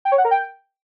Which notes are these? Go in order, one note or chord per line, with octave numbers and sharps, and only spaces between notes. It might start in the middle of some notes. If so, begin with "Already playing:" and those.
G5
C#5
F#5
A#4
G5